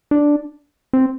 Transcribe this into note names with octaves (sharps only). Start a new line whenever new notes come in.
D4
C4